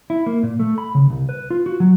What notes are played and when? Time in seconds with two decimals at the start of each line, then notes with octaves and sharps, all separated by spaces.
0.10 E4
0.26 A#3
0.43 A#2
0.59 A3
0.78 B5
0.95 C#3
1.10 C2
1.29 B4
1.50 F4
1.66 F#4
1.80 F#3